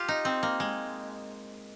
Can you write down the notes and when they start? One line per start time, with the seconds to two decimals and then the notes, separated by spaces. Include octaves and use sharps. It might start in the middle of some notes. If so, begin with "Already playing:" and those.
Already playing: F4 G4
0.08 D#4
0.25 C4
0.43 A#3
0.60 G#3